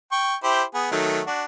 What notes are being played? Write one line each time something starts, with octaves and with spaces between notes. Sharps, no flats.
G5 C#6
E4 G4 C5
B3 G#4
D#3 F#3 A3
D4 F#4